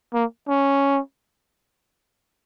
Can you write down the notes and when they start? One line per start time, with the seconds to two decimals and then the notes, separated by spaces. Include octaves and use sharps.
0.14 A#3
0.48 C#4